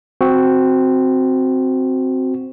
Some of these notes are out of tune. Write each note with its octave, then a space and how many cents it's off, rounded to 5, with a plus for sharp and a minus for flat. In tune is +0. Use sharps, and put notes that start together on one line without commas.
C4 +0 F#4 +0